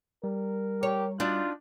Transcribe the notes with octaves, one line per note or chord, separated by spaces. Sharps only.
G3 A#4
G4 C#5
D4 D#4 F4 F#4